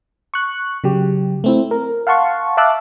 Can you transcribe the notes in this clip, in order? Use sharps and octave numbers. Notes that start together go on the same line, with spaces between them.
C#6 F#6
C#3 F#3 G4
A3 C4 E4
A#4
F5 F#5 A5 C6 C#6
E5 F5 A5 D6 E6 F#6